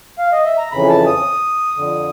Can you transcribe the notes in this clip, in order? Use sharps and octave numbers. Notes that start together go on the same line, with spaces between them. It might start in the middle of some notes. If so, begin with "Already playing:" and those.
F5
D#5
E5
A#5
F2 C#3 E3 B5
A5
D#6
F2 D3